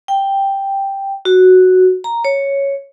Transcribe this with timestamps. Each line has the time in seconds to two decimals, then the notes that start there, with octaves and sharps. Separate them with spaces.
0.08 G5
1.25 F#4
2.04 A#5
2.25 C#5